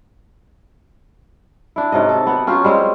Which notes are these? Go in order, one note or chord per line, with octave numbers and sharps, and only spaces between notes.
D4 E4
G#2 C3 F#3 D#5
A4
B3 F#5 G5
F#3 C#4 F4 G4
G3 G#3 C4 C#5